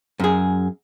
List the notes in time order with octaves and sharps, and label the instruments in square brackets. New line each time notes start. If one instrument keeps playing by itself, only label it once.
[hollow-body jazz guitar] F#2 G#4